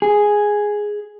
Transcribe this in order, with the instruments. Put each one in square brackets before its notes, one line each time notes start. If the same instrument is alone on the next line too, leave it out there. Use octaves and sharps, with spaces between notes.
[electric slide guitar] G#4